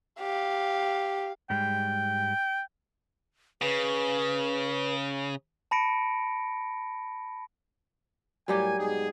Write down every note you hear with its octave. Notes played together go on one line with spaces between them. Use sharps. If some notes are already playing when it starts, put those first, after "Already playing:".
G4 F5
G#2 G3 G#3 G5
C#3 B4
A5 B5 A#6 C#7 D7
A2 F#3 G3 G4 A#4 G#5
G#2 B2 G#4